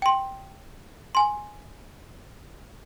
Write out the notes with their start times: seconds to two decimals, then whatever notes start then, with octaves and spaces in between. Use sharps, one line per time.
0.02 G5 C6
1.15 G#5 C6